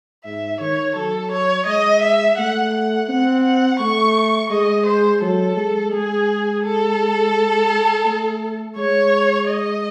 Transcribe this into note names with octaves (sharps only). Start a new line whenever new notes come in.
G#2 E5
D#3 C#5
F#3 A4
C#5
G#3 D#5
E5
A3 F#5
F#5
C4 F#5
F#5
A3 C#6
G#3 D#5
C5
F#3 A4
G#3
G#3 G#4
A4
A3
G#3 C#5
D#5